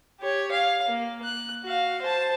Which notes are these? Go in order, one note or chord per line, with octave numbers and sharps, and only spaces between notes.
G4 C#5
F5
A#3
F#6
F#4 F5
C5 A5